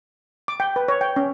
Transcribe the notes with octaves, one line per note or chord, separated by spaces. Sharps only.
D6
G5
B4
C#5
G5
C#4